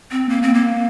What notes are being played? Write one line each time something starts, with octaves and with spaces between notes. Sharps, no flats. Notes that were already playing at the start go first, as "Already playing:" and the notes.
C4
A#3
C4
A#3